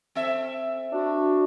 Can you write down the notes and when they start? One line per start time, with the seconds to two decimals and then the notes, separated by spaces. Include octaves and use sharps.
0.15 C4 A4 E5
0.93 D4 F#4